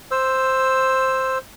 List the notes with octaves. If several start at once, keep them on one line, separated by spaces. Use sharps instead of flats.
C5 E6